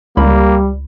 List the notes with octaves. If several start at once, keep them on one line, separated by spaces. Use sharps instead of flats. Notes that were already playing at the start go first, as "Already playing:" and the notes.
C#2 G3 A#3 B5